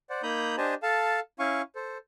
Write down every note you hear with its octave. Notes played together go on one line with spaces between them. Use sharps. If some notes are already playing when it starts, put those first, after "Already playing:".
C5 D5 F#5
A#3 D#4 A#5 B5 D#6 G6
D4 G4 C5 D#5 G#5 A5
A4 F5 A5
C#4 E4 F5 G#5 C#6
A4 C5